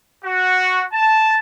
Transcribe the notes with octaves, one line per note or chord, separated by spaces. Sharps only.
F#4
A5